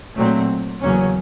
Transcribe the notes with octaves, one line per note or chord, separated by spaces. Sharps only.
A#2 F#3 A3 C4
E2 C#3 F#3 A#3 C#4